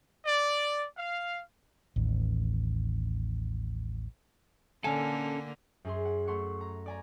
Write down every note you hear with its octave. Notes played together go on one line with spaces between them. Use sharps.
D5
F5
A1 D#2
D3 A#3 C#4 A4 G#5
F#2 G#4 C6
F#5
A3 F#5 C6 C#6 C#7
A#5
D5 G#5 A#5